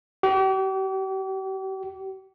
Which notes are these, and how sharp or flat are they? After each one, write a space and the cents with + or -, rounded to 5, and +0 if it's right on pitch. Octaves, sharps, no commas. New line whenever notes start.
G4 -40